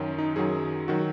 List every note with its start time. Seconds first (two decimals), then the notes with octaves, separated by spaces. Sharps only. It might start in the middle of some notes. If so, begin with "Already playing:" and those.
Already playing: F#2 D#3 F#3
0.18 D#4
0.36 F#2 D#3 F#3 G#4
0.88 D#3 F#3 F#4